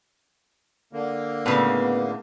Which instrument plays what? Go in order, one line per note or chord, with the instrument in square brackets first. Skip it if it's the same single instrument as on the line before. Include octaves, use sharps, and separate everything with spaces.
[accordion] D3 A#3
[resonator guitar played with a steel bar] A2 C#3 [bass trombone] B3